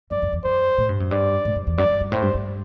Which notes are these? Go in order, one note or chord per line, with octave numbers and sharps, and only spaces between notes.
F#2 D5
F#2
E2
F#2 C5
A2
G2
F#2
G2 D5
A2
F#2
E2
F#2 D5
G2
G2
A2 C5
G2
G2